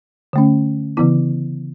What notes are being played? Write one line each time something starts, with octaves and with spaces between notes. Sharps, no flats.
D3 A3 C#4
C#3 E3 B3 E4